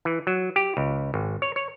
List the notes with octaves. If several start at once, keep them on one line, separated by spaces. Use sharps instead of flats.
E3
F#3
G4
C#2
G#1
C#5
C#5